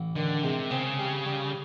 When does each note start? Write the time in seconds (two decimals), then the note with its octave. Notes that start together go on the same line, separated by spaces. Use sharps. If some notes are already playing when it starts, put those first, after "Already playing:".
Already playing: A1
0.16 D3 D#3
0.43 C3 G#3
0.71 C#3 C4
0.99 G3
1.26 G3